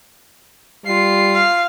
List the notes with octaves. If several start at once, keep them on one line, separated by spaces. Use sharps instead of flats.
G3 F4 C7
F5